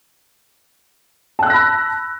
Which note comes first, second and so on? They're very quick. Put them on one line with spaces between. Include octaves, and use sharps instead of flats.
A5 F#6 E6 A#6 B5